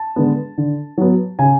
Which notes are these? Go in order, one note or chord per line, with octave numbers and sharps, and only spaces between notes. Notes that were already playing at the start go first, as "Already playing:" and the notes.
Already playing: A5
D3 G#3 B3
D3
F#3 B3
C#3 G#5